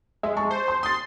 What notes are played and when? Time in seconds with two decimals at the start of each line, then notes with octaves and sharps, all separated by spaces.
0.23 G#3 E5
0.37 A5 C#6
0.51 C5
0.68 C6
0.83 C6 D#6 A6